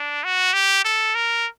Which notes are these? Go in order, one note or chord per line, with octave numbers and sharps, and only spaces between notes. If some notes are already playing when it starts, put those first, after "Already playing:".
Already playing: D4
F#4
G4
A4
A#4